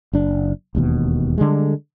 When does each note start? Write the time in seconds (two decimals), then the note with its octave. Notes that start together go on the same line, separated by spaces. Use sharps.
0.13 F#1 D4
0.75 E1 D#2 B2
1.38 D3 G3 G#3